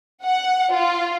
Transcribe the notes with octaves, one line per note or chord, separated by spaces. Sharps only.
F#5
F4